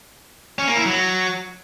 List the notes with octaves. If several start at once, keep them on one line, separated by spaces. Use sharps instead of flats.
C#4
A#3
E4
F#3